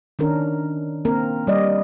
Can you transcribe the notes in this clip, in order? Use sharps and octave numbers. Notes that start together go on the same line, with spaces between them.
D#3 C#4 D4 A#4
A#3 C4 A#4
G3 D5 D#5